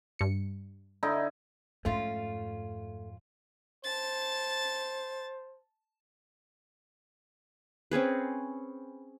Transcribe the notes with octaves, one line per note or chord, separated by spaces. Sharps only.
G2 C#7
D3 D#4 E4
F2 G#2 A3 C#4 F4
C5 A5 A6
C4 C#4 G#4 B4